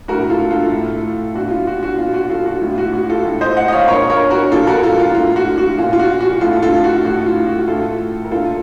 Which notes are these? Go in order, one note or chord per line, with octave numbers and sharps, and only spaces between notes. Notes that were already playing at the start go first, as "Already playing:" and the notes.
A2 F#4 A#4
F4 A4
F4 A4
A2
A#2 F#4
F4
F#4
F#4
A#2 F4
F#4
F4 A4
F#4
A2 F4
F#4
F#4
F4 A4
A2
C5 D#5
D#5 F#5
D#5
C#5 F5
A#2 A#4 C#5
A#4 C#5
F#4 A#4
A#2 F4 A4
F#4 A#4
F4 A4
F4
A2 F4
F#4
F#4
A#2 F4
F4
F#4
F#4
A2 F4 A4
F4 A4
F#4
A2 F#4
F4
F#4
A2 F4 A4
A#4
A#2 F4 A4